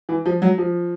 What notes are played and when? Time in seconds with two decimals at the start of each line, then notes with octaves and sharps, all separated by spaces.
0.09 E3
0.26 F3
0.42 F#3
0.58 F3